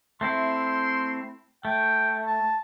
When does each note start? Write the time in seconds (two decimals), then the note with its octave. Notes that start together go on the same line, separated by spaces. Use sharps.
0.21 A3 C4 E4 C6
1.65 A3 G5
2.26 A5